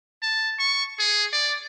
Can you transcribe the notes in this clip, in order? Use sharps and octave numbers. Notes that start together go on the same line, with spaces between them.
A5
C#6
G#4
D5